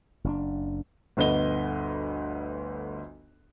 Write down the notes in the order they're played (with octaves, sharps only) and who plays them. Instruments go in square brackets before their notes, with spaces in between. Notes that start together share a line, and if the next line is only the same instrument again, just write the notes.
[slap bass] F#1 C#4 D4
[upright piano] G1 D2 B4 D#5 G7